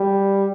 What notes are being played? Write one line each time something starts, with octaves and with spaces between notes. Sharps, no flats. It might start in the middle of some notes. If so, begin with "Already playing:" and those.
Already playing: G3